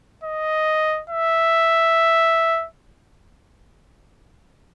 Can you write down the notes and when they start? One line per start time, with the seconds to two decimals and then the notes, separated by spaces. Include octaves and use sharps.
0.24 D#5
1.10 E5